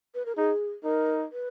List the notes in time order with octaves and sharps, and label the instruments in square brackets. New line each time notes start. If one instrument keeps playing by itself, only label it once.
[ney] B4
A#4
[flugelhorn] D#4 [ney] G#4
[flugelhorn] D#4 [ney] A#4
[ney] B4